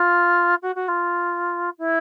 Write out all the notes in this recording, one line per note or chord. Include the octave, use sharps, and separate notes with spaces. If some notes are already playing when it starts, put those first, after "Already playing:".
Already playing: F4
F#4
F#4
F4
E4